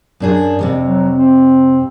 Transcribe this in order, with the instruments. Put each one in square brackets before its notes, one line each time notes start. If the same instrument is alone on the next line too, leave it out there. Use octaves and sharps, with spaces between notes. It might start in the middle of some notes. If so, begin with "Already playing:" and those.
[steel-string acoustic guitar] F#2 D4 G#4
F2 A2 C3
[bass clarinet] F#3
C4